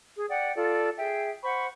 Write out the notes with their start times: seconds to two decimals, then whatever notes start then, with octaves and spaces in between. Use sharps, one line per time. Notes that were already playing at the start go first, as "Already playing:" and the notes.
0.17 G#4
0.30 D5 F#5 G5
0.56 F4 A4 D5
0.98 G#4 E5 G5
1.44 C5 F#5 B5 C#6